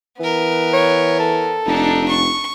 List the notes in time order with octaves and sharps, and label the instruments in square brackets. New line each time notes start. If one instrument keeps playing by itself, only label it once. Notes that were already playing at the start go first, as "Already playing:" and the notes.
[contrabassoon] E3 [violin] B3 A#4
[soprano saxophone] C#5
A4
[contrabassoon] F1 [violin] D4 D#4
[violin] C#6